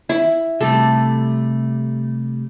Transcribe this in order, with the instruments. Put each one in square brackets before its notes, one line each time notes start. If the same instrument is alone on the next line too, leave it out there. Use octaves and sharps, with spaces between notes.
[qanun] E4
[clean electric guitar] C3 G3 A3 [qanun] A4